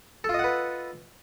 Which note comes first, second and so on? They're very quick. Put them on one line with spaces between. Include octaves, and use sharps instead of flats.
A4 F4 D#5 F#5 B4